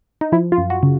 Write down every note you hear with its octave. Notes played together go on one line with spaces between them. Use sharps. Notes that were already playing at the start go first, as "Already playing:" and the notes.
D#4
F3 E4
F4
F#2
F#4
C#3